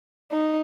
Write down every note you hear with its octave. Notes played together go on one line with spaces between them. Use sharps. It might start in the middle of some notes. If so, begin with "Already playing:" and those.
D#4